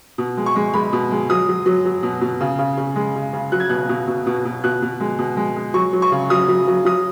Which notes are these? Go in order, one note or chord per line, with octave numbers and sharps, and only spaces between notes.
B2
G#3
C#6
G#3
G#3 B5
B2
G#3
F#3 D#6
F#3
F#3
F#3
B2
B2
C#3
C#3
C#3
G#3
C#3
C#3
F#3 F#6
G#6
B2 F#6
B2
B2
B2
B2
B2 F#6
B2
G#3
B2
G#3
G#3
F#3 C#6
F#3
C#6
C#3
F#3 D#6
F#3
F#3
F#3 D#6